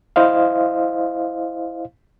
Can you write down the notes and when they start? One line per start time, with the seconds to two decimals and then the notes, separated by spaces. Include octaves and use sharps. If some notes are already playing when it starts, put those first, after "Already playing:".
0.16 E4 C5 D#5 F5